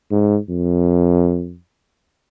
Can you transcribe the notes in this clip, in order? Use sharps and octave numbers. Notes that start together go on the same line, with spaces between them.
G#2
F2